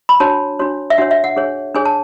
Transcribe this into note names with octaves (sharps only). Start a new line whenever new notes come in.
B5
D4 F#4 C#5 A5
D4 F#4 C#5
E5
D4 F#4 C#5 F#5
E5
F#5
D4 G#4 C#5
D4 G#4 C#5 G#5
A5